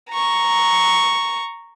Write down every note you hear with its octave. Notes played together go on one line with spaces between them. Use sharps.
A#5 C#6